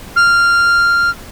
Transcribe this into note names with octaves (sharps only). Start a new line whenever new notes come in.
F6